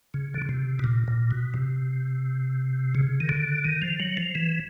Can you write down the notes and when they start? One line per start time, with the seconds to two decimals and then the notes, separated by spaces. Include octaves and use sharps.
0.14 C#3
0.34 D3
0.42 C#3
0.49 C3
0.79 B2
0.84 A#2
1.08 A#2
1.31 B2
1.54 C3
2.95 C#3
3.20 D#3
3.29 D3
3.65 D#3
3.82 F3
4.00 F#3
4.17 F3
4.35 E3